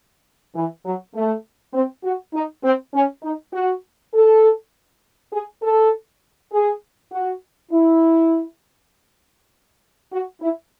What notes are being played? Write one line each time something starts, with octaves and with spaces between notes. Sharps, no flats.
E3
F#3
A3
C4
F#4
D#4
C4
C#4
D#4
F#4
A4
G#4
A4
G#4
F#4
E4
F#4
E4